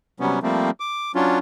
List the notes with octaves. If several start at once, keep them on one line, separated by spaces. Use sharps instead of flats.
C3 F#3 G3 B3 C#4
F3 G3 A3 A#3 C4
D6
F#3 C#4 D4 F4